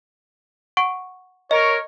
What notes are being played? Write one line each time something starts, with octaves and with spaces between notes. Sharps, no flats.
F#5 C#6 D7
A#4 C#5 D#5